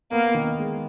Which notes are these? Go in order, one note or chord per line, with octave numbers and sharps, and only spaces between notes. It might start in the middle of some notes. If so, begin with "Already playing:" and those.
A#3 B3
D#3
G#3